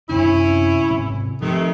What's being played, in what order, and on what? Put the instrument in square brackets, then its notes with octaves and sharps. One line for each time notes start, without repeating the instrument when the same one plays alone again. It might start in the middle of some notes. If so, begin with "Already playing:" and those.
[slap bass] F#2 C3 D4 [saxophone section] C#4 E4
[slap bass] G#2 C3 F#3
[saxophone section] C3 D#3 A3 [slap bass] F3